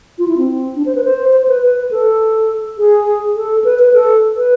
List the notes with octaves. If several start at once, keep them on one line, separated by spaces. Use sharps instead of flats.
F4
E4
C4
D4
C5
B4
C5
C5
B4
B4
A4
G#4
A4
B4
B4
A4
B4